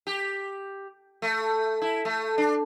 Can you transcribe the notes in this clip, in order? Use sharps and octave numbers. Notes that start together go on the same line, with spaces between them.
G4
A3
E4
A3
D4